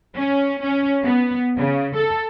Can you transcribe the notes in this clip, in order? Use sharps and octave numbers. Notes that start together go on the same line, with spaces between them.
C#4
C#4
B3
C#3
A4